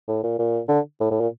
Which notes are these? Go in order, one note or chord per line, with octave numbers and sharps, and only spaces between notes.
A2
A#2
A#2
D3
A2
A2
A#2